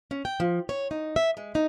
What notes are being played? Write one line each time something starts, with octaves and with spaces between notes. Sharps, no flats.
C#4
G5
F3
C#5
D#4
E5
G#3
D#4